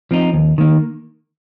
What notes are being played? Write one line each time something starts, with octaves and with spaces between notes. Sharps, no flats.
F3 C4 D#4
D#2
D#3 A#3